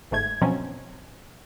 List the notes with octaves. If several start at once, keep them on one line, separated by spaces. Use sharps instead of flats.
G1 G#2 A3 G#6
B2 F3 F#3 C4 C#4